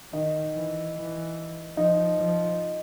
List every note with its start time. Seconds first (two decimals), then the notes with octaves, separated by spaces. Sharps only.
0.13 D#3 D#4
0.55 E3
0.96 E3
1.76 F3 D#4
2.17 F3